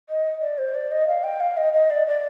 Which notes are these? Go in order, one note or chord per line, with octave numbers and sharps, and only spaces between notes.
D#5
D5
C5
D5
D#5
F5
G5
F5
D#5
D#5
D5
D5